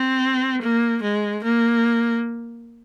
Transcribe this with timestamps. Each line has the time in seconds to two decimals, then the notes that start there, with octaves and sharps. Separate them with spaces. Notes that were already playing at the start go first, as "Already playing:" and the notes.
Already playing: C4
0.62 A#3
1.02 G#3
1.43 A#3